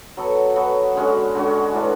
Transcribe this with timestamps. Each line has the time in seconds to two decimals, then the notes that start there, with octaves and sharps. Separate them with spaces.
0.17 F#3 B3 F#4 A4
0.56 F#3 B3 F#4 A4
0.95 D3 G#3 C#4 F#4
1.35 D3 G#3 C#4 F#4
1.74 A2 E3 G#3 D4